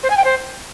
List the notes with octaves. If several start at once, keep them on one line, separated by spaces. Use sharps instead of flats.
C5
G#5
G5
C5